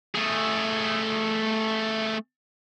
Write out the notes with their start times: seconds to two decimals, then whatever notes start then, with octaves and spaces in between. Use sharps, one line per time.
0.15 A3 G#4